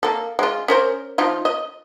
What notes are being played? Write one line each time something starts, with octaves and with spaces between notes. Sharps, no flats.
A#3 A4
G#3 F4
C#4 A#4 C5
F3 D#4 F4
D#5